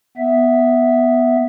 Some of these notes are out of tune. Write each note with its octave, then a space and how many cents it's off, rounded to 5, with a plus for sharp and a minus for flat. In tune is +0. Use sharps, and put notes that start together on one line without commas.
B3 +0 E5 +0